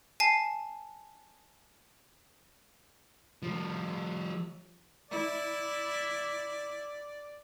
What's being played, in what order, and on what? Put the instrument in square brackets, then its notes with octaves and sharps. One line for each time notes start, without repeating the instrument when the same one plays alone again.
[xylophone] G#5 A5 C7
[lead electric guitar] F3 G3
[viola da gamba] E4 [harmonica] D5